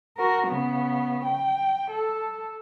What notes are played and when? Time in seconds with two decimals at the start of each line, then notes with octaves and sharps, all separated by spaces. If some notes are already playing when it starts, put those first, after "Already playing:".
0.17 F#4 A#4
0.48 C#3 B3
1.25 G5
1.91 A4